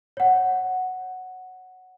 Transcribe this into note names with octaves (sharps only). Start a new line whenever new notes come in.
C#5 F#5